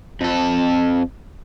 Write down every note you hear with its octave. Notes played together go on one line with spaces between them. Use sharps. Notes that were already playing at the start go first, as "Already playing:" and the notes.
F2 A4